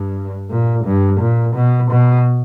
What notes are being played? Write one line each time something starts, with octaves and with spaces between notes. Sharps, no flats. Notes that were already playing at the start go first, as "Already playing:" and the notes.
Already playing: G2
A#2
G2
A#2
B2
B2